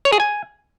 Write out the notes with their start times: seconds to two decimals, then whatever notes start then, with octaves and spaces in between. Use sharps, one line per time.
0.05 C#5
0.12 G#4
0.20 G#5